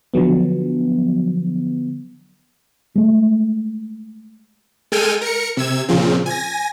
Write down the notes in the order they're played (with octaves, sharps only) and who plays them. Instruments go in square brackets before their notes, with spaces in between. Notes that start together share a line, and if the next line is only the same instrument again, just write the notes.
[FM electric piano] D3 F3 F#3 B3
[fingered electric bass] G#3 A3
[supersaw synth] G#3 A4 G5 G#5 F6 D#7
A#4 C#7
C3 E6 G#6
A#2 C#3 F3 C4
G#5 A#6